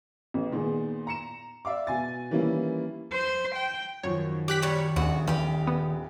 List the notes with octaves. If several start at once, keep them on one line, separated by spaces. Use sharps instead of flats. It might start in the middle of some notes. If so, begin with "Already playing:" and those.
A1
A#2 D#3 B3 G#4
A#5 C#7 E7
D5 E5 F5 D6
B2 G#5 A6
D#3 E3 G3 A#3 C#4 E4
C5
G5
F#2 D#3 F3 C#5
G4 D6 F#6 B6
A#2 G3 C#5
D#1 A#1 D#2 F#4
E2 G4 F5
B3